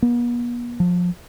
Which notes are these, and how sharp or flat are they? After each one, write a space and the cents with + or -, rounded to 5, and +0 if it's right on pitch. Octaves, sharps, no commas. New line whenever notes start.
B3 -45
F3 +25